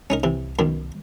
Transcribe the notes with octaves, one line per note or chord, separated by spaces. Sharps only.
C2 C#4 D#4 A#4
C3 E3
F#2 B2 D#3